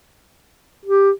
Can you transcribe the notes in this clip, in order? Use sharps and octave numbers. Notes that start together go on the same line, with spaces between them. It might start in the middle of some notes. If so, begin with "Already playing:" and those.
G4